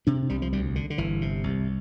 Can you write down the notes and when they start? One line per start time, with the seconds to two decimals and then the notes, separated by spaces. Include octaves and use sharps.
0.07 C3 D4
0.29 C2 G3
0.42 F3
0.53 D2 G3
0.76 D3
0.90 D3
0.98 G1 E3
1.22 C3
1.44 C2